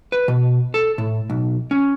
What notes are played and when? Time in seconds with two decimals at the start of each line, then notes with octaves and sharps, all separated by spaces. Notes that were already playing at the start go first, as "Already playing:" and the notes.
0.12 B4
0.28 B2
0.74 A4
0.98 A2
1.30 B1
1.71 C#4